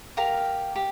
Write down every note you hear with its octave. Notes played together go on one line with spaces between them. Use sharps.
G4 A#4 F5 A#5
G4